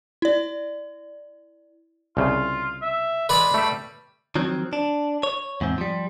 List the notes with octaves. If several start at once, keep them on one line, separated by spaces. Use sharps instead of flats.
E4 D5
C2 C#3 F4
E5
G#3 B4 D5 B5
G3 A3 E5
D#3 F3 F#3 C4
D4
C#5
E2 G#2 C4
F3 G3